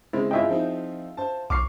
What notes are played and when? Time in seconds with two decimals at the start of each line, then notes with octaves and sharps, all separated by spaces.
0.13 C#3 G#3 C4 E4
0.31 E4 F4 G#4 D#5 E5 G5
0.49 F3 C4 D#4
1.17 C5 A5
1.50 B1 C#6 D6 F6 C7